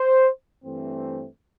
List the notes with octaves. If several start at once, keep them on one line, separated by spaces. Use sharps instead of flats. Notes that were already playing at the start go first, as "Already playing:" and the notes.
Already playing: C5
G2 E3 A3 C4